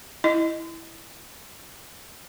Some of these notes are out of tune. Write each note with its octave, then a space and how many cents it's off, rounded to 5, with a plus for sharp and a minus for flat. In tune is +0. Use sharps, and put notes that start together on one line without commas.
E4 +0 D#5 +0